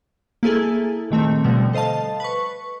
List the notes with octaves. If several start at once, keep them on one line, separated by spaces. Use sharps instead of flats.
A#3 E4 G#4 A4
A#2 D#3 A3 C4
B2 D3 F3 G3 A3
A4 C5 D#5 F5 A5
B4 C#6